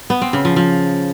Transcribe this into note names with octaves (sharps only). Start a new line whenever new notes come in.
B3
C4
C#3
F3
F3